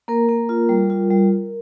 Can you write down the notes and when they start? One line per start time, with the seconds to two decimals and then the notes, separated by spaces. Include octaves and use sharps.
0.08 A#3 A#4
0.28 A#3
0.49 F4
0.69 G3
0.90 F4
1.10 G3